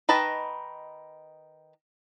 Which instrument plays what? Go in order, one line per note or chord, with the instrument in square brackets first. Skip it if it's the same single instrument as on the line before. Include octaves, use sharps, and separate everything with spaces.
[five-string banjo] D#3 B4 D#5 A5